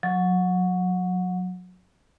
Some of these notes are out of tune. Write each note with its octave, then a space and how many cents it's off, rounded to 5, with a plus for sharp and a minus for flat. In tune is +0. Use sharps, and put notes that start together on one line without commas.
F#3 -25